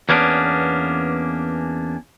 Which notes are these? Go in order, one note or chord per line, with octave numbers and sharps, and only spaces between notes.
E2 A#3 B3 C#4 D4